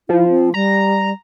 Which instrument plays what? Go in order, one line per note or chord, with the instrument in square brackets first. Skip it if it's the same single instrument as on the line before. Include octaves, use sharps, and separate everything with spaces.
[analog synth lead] F3 [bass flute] E4
[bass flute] C4
[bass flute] G3 [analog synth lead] A#5